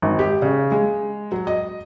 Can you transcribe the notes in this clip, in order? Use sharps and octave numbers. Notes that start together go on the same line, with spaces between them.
G#1
G4
C#3
G#3
F#3
D#5